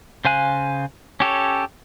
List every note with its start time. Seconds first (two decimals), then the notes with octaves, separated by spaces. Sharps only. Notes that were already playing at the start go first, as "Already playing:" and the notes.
0.25 C#3 C5 F5 G#5 F#6
1.20 C#4 G4 A4 C#5